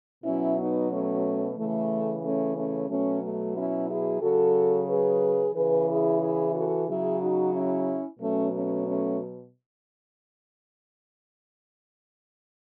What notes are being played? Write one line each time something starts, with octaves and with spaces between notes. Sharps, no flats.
B2 F#3 C#4 E4
B3 D#4
A3 C#4
C#3 E3 A3
A3 C#4
A3 C#4
B2 F#3 A3 C#4
A3
C#4 E4
E4 G#4
C#3 F#3 F#4 A4
G#4 B4
C#3 E3 G#4 B4
E4 G#4
E4 G#4
F#4 A4
C#3 F#3 E4 G#4
D#4 F#4
C#4 E4
B2 F#3 A3 C#4
A3 C#4
A3 C#4